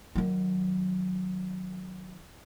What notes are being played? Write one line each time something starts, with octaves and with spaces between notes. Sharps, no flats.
D#3 F#3